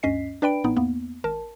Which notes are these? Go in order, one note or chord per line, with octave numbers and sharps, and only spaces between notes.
D2 G2 C#4 D#5 B6 C7
D4 B4 D5 G5 B5 D7
A1 A2 B3 D#4
E2 A#3 B3
G#1 A#4 A5